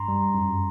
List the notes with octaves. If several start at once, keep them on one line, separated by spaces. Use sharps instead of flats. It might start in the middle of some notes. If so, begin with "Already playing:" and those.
Already playing: G2 A#5 C6
G3
F#2